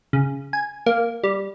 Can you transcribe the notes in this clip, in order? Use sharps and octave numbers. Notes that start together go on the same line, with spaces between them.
C#3
G#5
A#3
G3